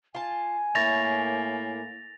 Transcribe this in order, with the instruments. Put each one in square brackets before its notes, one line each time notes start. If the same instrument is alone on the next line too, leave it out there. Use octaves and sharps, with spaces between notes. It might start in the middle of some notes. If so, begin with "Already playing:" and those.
[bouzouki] F4 A5 [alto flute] G#5
[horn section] A2 A#3 [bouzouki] E4 C#5 [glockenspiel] A6 A#6 F7